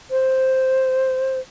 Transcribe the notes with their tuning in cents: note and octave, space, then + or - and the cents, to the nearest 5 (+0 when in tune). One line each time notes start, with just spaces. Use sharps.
C5 +0